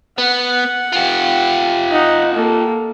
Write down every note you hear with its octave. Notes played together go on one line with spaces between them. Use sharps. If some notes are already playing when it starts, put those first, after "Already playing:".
B3 F#5
F4 G4
D#4 F#5
A#3 A4